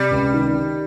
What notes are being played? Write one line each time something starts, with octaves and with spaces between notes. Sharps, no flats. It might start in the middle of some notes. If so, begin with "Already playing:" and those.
Already playing: C3 G3
C#2
D#3